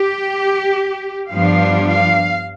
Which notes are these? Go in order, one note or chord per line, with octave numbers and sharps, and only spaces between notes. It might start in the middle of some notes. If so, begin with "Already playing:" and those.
Already playing: G4
G2 F3 B3 D4 F5
F5